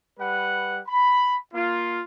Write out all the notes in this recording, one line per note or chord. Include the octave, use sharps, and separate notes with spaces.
G3 B4 F#5
B5
A#3 F4